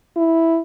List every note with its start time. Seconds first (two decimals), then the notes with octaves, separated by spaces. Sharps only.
0.16 E4